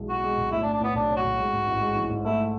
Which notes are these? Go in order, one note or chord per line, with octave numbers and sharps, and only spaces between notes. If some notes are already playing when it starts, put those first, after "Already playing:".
Already playing: B1 E3 G#3
B2 F#4
G#3
B1
A2 E4
D4
A2
D4
A2 B3
B1 D4
C#4
F#4
B1
G#3
G#2
A1
G#3
E3
G#2
A3 E4